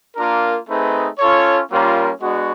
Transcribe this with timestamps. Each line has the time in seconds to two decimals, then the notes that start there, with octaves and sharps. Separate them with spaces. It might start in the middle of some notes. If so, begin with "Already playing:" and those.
0.16 A#3 D4 F4 A#4
0.68 A3 C4 D#4 G#4 B4
1.18 C#4 F4 A4 C#5
1.70 G3 A#3 C#4 F4 A#4
2.21 G#3 B3 D4 F#4